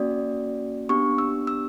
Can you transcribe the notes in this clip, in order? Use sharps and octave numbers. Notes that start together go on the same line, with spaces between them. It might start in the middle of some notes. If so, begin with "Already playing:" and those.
Already playing: A#3 C#4 F#4 D5
B3 D4 G4 C#6
E6
E6